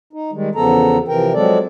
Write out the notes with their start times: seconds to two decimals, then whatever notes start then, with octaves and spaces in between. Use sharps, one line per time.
0.13 D#4
0.32 D#3 G3 G#3
0.55 E2 C#3 F3 B3 A4 A#5
1.08 C3 E3 F3 A#4 G5
1.34 F3 F#3 G#3 C4 A4 D5